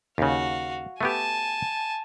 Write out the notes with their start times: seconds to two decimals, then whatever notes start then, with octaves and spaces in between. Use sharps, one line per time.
0.18 D#2 C#3 F#4 F5
1.01 A3 B3 G4 G#5 A5